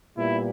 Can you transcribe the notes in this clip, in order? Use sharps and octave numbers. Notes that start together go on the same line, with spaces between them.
A#2 G3 B3 E4